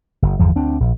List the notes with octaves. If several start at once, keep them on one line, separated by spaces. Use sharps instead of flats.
F#1
G1 E2 F3
D2 C4 D4
A#1